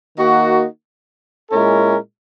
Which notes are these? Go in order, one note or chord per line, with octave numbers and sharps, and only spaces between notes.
D#3 A#3 D#4 F#4
A#2 G#3 C#4 E4 A#4